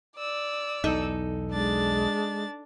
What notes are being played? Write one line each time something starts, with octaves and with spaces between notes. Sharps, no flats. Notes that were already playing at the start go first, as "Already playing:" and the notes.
D5 E6
B1 E2 D#4 A4
G#3 D4 A6